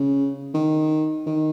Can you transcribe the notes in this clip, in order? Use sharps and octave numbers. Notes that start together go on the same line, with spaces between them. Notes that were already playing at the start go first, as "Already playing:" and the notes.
Already playing: C#3
D#3
D#3